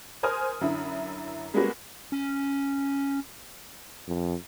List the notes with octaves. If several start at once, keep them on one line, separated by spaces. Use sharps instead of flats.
A#4 C5 G#5 D#6 F6
F#2 D3 E4
G3 G#3 A#3 B3 C#4 F#4
C#4
F2